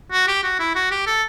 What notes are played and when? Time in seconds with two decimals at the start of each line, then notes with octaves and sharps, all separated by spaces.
0.11 F#4
0.27 G4
0.43 F#4
0.59 E4
0.75 F#4
0.91 G4
1.06 A4